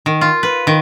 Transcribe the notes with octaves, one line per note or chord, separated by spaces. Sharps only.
D#3
F4
B4
D#3